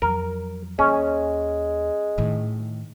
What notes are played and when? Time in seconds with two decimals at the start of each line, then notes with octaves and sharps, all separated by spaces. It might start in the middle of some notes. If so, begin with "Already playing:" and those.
0.02 F2 F#3 A#4
0.79 D#2 G#3 C#4
2.18 A2 D#3